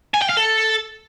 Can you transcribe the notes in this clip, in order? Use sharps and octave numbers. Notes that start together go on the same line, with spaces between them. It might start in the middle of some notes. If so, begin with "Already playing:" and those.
G#5
G5
F5
A4